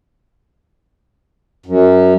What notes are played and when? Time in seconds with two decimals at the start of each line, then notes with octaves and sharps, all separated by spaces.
1.66 F#2